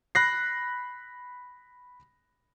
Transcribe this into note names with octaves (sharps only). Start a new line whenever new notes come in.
B5 F#6 A#6 C7